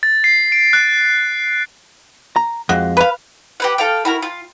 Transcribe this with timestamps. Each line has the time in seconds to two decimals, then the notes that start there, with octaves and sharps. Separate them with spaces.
0.03 A6
0.24 C7
0.52 D7
0.73 F#6
2.36 A#5
2.69 F2 G#3 F#4
2.97 B4 F5
3.60 G4 B4 F#5
3.78 A4 F5 G5
4.05 E4 F#4 A#4
4.22 F4